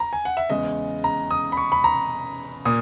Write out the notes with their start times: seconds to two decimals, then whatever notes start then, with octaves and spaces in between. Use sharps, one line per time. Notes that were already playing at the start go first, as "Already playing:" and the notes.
0.00 A#5
0.13 G#5
0.25 F#5
0.37 E5
0.50 E2 C#3 G#3 D#5
1.04 A#5
1.31 D#6
1.52 B5
1.57 C#6
1.72 B5
1.84 A#5
2.65 A#2 A#3 D#6